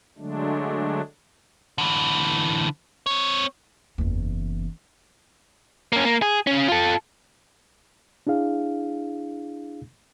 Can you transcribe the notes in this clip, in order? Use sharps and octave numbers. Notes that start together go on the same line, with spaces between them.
D3 F#3 G#3 A3 D4
D3 E3
C4 C#5
F#1 E2
A#3 C#4
A#3
G#4
C#3 C#4
F4 A4
D4 E4 G#4 F5